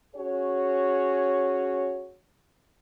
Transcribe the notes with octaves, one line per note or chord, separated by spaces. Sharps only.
C#4 F#4 G#4 C#5